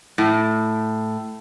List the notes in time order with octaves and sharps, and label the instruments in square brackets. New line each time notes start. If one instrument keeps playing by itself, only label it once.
[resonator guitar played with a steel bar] A2